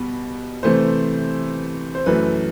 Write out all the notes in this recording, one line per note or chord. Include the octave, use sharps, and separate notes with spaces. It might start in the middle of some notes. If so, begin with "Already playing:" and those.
Already playing: B2 G3 B3
C3 E3 A3 C5
C5
F#2 E3 A3 B4